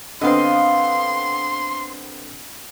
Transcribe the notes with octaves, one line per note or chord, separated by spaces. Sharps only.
D3 B3 C4 D#5 F5 C6